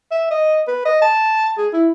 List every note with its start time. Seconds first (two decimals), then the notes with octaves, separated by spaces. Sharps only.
0.11 E5
0.30 D#5
0.67 B4
0.85 D#5
1.02 A5
1.58 G#4
1.73 E4